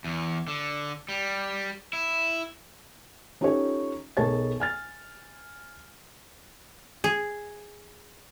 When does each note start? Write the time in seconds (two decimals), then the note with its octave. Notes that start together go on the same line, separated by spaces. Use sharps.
0.04 E2
0.48 D3
1.09 G3
1.93 E4
3.41 C#4 D#4 F4 G4 A4 C#5
4.17 B1 G#4 A#4 C#5 A5 A6
4.60 G#5 F6 A6
7.04 G#4